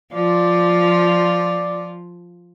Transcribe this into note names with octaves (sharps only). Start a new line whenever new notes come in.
F3 F4 D5